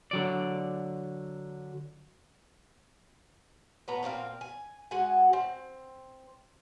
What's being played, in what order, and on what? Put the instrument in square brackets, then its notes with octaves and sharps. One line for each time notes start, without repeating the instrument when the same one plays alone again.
[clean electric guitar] D3 F#3 D5
[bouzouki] A2 B3 A#5
A#2 A#3 C4 F5
G#5
G#3 F#4 F#5 G#5
C4